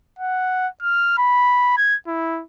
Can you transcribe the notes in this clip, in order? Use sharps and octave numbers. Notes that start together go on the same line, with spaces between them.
F#5
F6
B5
G#6
E4